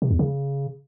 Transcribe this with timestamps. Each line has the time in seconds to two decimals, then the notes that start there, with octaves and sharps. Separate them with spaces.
0.02 C3
0.11 E2
0.19 C#3